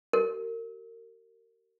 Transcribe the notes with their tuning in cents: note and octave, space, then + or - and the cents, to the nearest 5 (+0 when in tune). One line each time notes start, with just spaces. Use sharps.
F#4 +45 A#4 -30